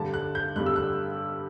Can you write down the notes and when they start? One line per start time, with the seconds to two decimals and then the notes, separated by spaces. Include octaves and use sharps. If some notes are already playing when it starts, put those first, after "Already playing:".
Already playing: G2 D3 G3 A5
0.14 F#6
0.35 G6
0.56 G2 D3 G3 F#6
0.66 E6
0.76 F#6